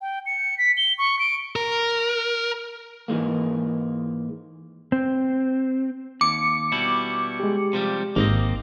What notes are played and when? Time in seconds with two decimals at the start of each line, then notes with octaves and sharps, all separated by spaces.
0.01 G5
0.26 C#7
0.58 B6
0.77 G7
0.98 C#6
1.19 D7
1.56 A#4
3.08 G#2 E3 G#3 A#3
4.92 C4
6.21 D#2 D6 C#7
6.72 B2 G3 E4
7.40 G#3 G4
7.73 C3 F3 G3
8.16 G#1 A#3 C4 D#5